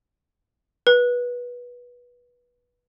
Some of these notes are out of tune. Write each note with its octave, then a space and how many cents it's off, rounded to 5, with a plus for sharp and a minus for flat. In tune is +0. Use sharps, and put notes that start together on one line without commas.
B4 -20